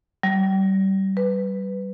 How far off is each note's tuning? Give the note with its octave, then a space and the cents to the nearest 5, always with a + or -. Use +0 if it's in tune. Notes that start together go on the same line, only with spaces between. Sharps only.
G3 -30
B4 +10